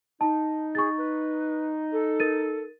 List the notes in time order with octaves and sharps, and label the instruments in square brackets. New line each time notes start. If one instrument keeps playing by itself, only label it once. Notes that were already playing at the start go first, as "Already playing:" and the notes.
[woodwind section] D#4 [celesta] A5
[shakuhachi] G#4 [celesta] C#6 A6
[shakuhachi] B4
A4
[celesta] A#4 A6 D#7